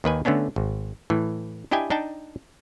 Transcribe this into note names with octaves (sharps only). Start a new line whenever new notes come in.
D#2 D#3 B4 G#5
D3 A3 B3 C#4 D4
G#1
A2 E3
D4 E4 G4 D#5 G5 G#5
D4 D#4 G5 A5